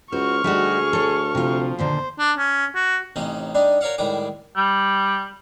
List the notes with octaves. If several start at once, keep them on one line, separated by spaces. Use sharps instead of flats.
C#2 F#4 C5 C#6 F6
D2 G3 D#4 F#4 G#4
A4 C#5
C3 F3 F4
D#2 A#2 D3 C5
D4
C#4
F#4
A1 C3 C#4 D#4
G3 D4 D#4
A#4 C#5 D5 F5 F#5
A2 D#3 G3 G#3 D6
G3